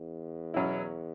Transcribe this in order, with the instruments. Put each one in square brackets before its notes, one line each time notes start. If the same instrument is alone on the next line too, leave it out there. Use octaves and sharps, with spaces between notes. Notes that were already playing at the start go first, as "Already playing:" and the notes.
Already playing: [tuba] E2
[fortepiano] B2 F#3 C#4 E4